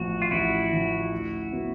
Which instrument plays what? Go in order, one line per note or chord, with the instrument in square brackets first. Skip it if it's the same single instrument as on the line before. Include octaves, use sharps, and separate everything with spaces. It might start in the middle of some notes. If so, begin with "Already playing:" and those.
Already playing: [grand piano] A1 A2 F3 [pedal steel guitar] F#4
[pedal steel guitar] F4
[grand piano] A1 [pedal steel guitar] E4 F#4
[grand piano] A2 F3
D2
C#3 F#3 B3